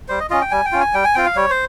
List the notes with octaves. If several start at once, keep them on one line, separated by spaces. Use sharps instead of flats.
G3 C5
D#5
C#4 F4 D#5
G5
G3 G#5
G5
C#4 F4
G#5
G3 G5
G#5
C4 F4 G5
F5
G3 C#5
C5